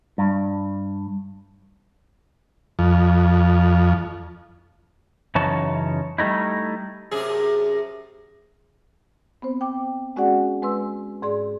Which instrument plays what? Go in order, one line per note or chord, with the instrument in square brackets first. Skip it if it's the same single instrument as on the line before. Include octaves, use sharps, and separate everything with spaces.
[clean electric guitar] G2
[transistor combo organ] F2
[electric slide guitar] F#2 C#3 E3 D#4 C#5 A5
G3 A3 D#4 E4
[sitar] F#2 C3 G#4
[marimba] B3 C4 C5
G5 D6
G#3 C#4 F#4 G#4 D5 F#5
G#3 B4 C6 E6
G#2 G#4 D5 C6